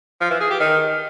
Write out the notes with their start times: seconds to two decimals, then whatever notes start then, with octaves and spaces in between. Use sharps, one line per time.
0.21 F3
0.31 E3
0.40 G#4
0.50 G4
0.60 D#3